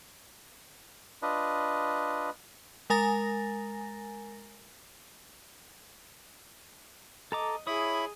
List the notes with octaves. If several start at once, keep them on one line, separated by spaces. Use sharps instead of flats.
D4 F4 B4 D#5
G#3 A#4 G#5 A#5 A6 A#6
A4 D#5 A#5 D6
E4 G#4 C#5 B5 D#6